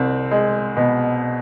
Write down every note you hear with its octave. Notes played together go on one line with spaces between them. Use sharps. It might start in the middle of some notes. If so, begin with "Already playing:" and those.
Already playing: C2 C4
G#3
B2